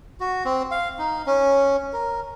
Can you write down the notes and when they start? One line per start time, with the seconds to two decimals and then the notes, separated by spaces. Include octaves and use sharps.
0.20 F#4
0.45 C4
0.71 F5
0.99 D#4
1.26 C#4
1.93 A#4